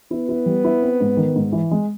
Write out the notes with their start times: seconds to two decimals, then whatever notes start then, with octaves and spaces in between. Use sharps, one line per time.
0.11 B3 E4
0.29 E4
0.46 G3
0.64 E4
0.82 C4
1.00 G#2
1.17 D#3
1.36 G#2
1.52 E3
1.71 G#3